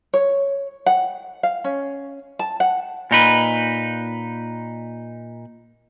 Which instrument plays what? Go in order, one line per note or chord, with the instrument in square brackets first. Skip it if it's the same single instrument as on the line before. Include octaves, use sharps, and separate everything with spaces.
[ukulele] C#5
F#5
F5
C#4
A5
F#5
[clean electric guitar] A#2 D#4 B4